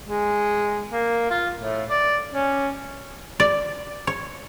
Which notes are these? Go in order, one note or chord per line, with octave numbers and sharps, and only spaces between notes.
G#3
A#3
F4
A2
D5
C#4
D5
C#5